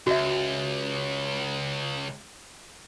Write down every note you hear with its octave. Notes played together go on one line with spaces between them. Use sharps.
C#2 F#4 E5